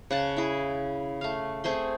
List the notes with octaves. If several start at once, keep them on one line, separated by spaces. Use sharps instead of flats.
C#3 F#5 A5
E4 G#4
A3 F5
A3 C4 G#4 C6